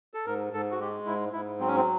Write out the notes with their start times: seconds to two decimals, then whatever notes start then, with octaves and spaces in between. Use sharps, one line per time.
0.14 A4
0.26 G#2 A#4
0.53 G#2 A4
0.71 F#4
0.79 G#3 G4
1.06 G#2 E4
1.33 G#2 E4
1.60 F#3 C4
1.68 C#4
1.76 C4